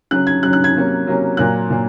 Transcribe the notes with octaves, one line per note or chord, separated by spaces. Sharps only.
C#3 F#3 C#4 F#6
G#6
C#3 F#3 C#4 F#6
F#6
G#6
C3 F#3 A#3 C#4
C3 F#3 A#3 C#4
A#2 F#3 A#3 F#6
A#2 F#3 A#3